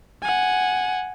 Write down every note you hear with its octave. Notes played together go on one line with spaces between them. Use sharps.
F#5 G#5